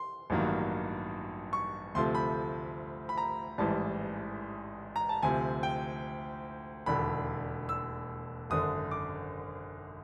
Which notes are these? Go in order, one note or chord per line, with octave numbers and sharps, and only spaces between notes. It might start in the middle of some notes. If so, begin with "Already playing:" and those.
Already playing: C6
A1 G2 D#3 F#3 A#3
C#6
D2 C3 F3 A3 C6
B5
B5
A#5
A1 G#2 E3 G3 A5
A#5
A5
D2 C3 F3 G#5
G5
E1 D#2 D3 B5
E6
G#1 F#2 D3 D#6
D6